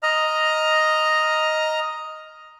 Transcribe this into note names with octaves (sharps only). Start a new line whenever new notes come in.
D#5 A#5 F6